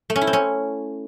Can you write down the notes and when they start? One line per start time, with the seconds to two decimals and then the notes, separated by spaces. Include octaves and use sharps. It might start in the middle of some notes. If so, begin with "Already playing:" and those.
0.10 A3
0.16 C#4
0.21 E4
0.27 C4
0.33 C#4